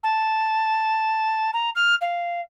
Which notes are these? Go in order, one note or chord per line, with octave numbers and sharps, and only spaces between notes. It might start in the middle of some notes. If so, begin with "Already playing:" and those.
A5
A#5
F6
F5